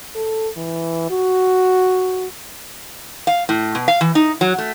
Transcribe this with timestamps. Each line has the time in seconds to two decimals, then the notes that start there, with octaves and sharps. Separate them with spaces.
0.15 A4
0.57 E3
1.11 F#4
3.27 F5
3.49 A2
3.75 B2
3.88 F5
4.01 E3
4.15 D#4
4.41 F#3
4.58 A3